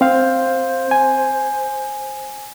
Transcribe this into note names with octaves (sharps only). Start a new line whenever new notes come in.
C4 C5 F5
G#5